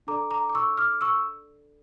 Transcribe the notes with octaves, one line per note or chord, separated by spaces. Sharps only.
D4 A4 D5 A#5 D6
A#5 D6
D6
C#6 E6
D6 F6
C#6 E6